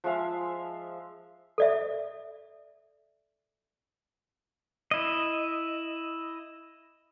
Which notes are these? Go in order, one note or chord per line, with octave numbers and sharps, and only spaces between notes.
F3 G#3 E5 F5
A4 D5 E5
E4 D#5